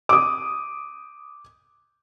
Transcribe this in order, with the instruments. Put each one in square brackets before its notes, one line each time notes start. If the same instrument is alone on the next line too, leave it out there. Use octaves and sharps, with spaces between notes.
[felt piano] D6 D#6